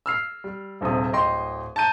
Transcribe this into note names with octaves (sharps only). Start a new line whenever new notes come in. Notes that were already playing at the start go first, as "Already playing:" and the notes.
E6 F6 C7
G3
D#1 A#1 C3 D#6
D1 D#5 G5 C6
A5 A#5 G6 D#7